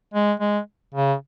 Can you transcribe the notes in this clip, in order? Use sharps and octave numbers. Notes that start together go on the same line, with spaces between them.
G#3
G#3
C#3